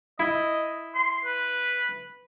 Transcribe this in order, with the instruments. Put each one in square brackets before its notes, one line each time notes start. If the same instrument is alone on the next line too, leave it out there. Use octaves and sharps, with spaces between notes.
[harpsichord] E4 [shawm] D#5
[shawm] C6
B4